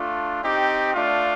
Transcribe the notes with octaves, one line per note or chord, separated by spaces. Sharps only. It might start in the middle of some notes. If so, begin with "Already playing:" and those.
Already playing: A3 D4 F4
C4 D#4 G4
A3 D4 F4